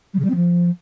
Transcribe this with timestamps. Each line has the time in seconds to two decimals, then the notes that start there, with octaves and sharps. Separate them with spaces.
0.13 G3
0.19 C#3
0.24 G3
0.29 C4
0.35 F3